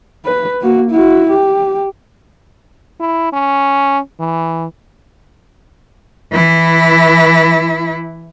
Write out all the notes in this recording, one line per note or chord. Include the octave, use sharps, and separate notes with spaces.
B4
A#3 F#4
E4 F#4
G4
E4
C#4
E3
E3 E4